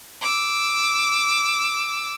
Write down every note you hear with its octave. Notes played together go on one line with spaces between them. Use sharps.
D6 E6